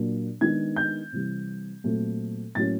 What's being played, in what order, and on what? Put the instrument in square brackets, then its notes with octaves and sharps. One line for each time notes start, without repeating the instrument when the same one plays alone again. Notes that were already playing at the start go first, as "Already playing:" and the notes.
Already playing: [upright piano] A#2 F#3 A#3 D4
D#3 G#3 B3 D4 G#6
G6
C3 E3 G3
A#2 F#3 A3 C4
A2 F#3 A#3 C#4 A6